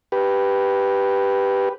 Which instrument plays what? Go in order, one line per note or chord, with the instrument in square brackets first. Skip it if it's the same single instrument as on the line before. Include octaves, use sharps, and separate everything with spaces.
[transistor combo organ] G4 B4